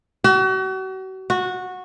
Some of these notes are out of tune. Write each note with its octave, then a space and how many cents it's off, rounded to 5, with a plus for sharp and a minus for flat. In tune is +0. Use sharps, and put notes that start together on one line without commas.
F#4 +40
F#4 -15